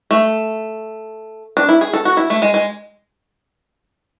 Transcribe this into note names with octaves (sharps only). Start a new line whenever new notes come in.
A3
D4
E4
G#4
A4
F#4
E4
A3
G#3
G#3